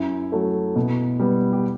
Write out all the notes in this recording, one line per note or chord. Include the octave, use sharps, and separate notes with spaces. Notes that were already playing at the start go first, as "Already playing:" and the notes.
Already playing: F#2 E4
F#3 A3
B2
G3 B3
G4